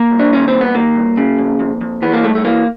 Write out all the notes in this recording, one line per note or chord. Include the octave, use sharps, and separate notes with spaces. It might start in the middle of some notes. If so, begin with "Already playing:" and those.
Already playing: A#3
C2
D4
D#3 C#4
C4
G2
B3
D#3 A#3
G2
C#3
F2
F2
F2
E3 B3
A#3
G2 A3
A3
E3 A#3